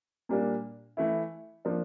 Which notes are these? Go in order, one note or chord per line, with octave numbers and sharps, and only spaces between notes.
A#2 G3 A#3 D4
E3 A3 E4
F3 A#3 D4